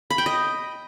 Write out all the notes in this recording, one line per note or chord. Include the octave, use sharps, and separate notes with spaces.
B5
G5
D#5